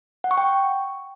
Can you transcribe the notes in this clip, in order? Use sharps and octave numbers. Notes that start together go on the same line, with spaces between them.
F#5
C#6
G5